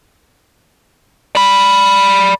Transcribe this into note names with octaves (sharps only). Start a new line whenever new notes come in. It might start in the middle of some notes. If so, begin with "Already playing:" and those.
D5 B5